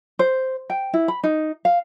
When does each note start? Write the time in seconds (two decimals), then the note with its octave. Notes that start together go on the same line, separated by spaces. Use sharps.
0.19 C5
0.70 G5
0.94 E4
1.08 B5
1.24 D#4
1.65 F5